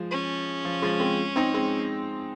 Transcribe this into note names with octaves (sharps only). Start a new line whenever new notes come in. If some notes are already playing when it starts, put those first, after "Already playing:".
Already playing: F3 G#3
C#4
F3
F3 G#3
G#3 C4
C4 D#4
G#3 C4